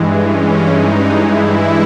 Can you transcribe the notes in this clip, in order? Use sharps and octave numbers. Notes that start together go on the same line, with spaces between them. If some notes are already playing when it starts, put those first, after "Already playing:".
Already playing: G2 E3 G#3
C#4
D#4
E4